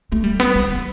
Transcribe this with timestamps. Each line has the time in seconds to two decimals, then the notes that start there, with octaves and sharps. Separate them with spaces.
0.12 A3
0.24 G3
0.40 B3
0.56 B3
0.70 G3